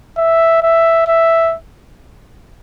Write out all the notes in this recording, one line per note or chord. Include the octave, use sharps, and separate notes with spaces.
E5
E5
E5